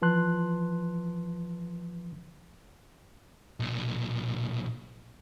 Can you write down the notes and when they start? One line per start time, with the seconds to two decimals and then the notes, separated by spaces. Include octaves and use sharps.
0.02 E3 F3 B4 A5 C6 F#6
3.60 B1 A#2